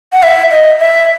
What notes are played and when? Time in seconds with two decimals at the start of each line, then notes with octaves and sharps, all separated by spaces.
0.13 F#5
0.23 E5
0.51 D#5
0.79 E5